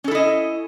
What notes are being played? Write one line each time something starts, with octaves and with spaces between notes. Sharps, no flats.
C#4 E4 A4 D#5